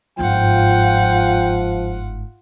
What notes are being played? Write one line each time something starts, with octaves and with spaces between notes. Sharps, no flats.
G1 G#2 F3 F4 F#5 G5